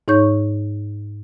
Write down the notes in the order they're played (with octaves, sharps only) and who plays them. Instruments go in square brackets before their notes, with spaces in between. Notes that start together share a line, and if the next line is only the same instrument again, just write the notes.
[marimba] G#2 D#4 C#5 C#6 G6